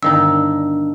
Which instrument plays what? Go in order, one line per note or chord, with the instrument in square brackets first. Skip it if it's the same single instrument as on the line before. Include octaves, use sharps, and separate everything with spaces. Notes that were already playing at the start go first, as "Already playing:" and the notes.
[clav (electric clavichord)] G1 D#3 D#4 [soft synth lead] D4 [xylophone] E6